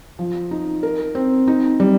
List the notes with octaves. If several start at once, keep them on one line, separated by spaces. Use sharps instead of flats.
F3
D#4
A#4
C4
D#4
G3